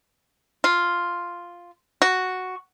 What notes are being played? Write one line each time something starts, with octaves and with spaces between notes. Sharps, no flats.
F4
F#4